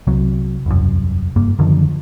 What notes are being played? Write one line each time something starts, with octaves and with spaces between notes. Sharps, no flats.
C2 C3 F#3
E1 C2 F#2
F#1 G2 A#3
F#2 D3 D#3 F3